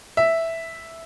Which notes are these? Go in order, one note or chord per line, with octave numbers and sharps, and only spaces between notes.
E5